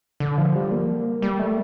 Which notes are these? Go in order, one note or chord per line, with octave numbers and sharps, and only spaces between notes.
D3
F3
G3
A#3
G3
A3